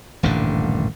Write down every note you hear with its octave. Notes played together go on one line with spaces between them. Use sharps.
D#1 A1 G2 D3